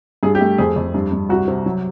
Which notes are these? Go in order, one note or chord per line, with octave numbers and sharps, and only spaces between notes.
G2 G#4
G4
A3
F2 G#4
F2
G2
G2
C2 F#4
C3
F#3